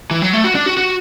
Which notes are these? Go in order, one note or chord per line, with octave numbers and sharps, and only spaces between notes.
E3
F#3
A3
F#4
D4
F#4
F#4